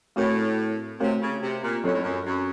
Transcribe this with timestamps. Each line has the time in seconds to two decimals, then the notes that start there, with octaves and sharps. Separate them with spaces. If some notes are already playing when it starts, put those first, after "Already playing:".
0.16 A2 A3 C4 F#4 A#4 C#5
1.00 C3 A3 C4 F#4 A#4 C#5
1.21 C#3
1.42 C3
1.63 A#2
1.84 F#2 F#3 C4 F4 A4 C#5
1.93 A2
2.02 F#2
2.25 F#2